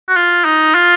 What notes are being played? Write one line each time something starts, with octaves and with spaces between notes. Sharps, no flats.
F#4
F4
D#4
F4